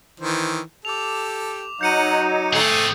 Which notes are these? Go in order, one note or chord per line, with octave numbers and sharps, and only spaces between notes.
D#3 E3 C5
G4 A4 D6 F7
F#3 D#4 F#5 G6 C#7 D#7
A3 C4 G#4